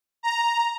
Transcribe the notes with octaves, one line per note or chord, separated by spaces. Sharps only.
A#5